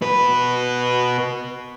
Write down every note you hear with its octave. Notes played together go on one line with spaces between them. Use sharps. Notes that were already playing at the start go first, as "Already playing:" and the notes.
B2 B4